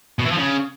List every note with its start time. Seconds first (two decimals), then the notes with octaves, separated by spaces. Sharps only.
0.19 B2
0.25 E3
0.31 F3
0.37 C#3